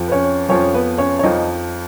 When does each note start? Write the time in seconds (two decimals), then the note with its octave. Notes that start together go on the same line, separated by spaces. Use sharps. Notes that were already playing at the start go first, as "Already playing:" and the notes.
Already playing: F2 F3
0.08 B4
0.12 C#4 C#5
0.49 F2 F3 C#4 C#5
0.74 B3 B4
0.98 C#4 C#5
1.19 C#5
1.23 F2 F3 D#4 D#5